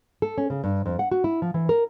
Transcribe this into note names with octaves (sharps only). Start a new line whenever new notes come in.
A4
C#4
C#3
G2
F2
F#5
F#4
E4
F3
E3
A#4